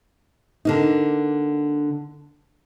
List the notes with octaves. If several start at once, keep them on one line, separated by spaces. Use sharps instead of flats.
D3 A#3 D#4